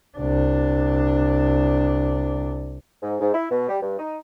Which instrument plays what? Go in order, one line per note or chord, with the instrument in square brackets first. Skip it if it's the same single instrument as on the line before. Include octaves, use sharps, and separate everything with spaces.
[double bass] C2 D4
[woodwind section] G#2
G#2
E4
B2
G3
G2
D#4